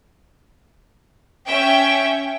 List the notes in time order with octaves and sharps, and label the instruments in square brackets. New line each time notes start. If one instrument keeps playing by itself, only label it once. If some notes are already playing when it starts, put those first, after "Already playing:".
[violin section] C#4 E5 G5